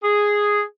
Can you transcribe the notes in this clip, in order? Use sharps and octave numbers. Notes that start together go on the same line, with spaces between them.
G#4